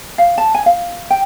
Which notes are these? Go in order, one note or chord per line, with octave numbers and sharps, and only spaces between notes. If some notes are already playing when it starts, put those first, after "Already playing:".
F5
A5
G#5
F5
G5